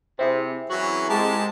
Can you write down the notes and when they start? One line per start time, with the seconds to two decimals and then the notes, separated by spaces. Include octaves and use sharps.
0.19 C3 C4 E4 G#4
0.70 E3 F#3 C#4 F#4
1.09 G#2 G#3 G4 A4 A#4 A5